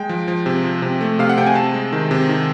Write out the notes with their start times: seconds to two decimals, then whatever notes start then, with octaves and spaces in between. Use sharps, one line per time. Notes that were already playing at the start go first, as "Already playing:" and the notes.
Already playing: G#3 G5
0.09 F3
0.28 F3
0.46 C3
0.64 F3
0.82 C3
1.01 A3
1.19 C3 F5
1.29 F#5
1.38 C3 G5
1.47 G#5
1.55 C3 A5
1.74 G#3
1.92 D#3
2.11 C3
2.29 D#3